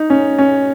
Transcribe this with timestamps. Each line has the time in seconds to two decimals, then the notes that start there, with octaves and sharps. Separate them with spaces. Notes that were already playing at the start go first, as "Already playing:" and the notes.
Already playing: D#4
0.10 C#4
0.38 C#4